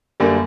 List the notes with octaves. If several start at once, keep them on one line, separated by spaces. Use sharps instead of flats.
F#2 D3 G3 A#3